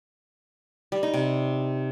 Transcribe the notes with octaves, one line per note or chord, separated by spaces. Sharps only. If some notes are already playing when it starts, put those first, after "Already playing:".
G3
D#4
C3